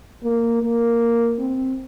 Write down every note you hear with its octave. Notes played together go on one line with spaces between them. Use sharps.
A#3
A#3
C4